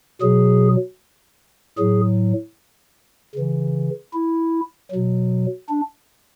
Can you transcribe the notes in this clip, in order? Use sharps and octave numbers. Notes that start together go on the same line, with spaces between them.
B2 F#3 G#4
A2 F#3 G#4
C#3 E3
E4
B2 F#3
D4